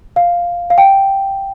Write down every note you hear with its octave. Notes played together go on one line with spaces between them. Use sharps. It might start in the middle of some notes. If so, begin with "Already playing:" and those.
F5
F5
G5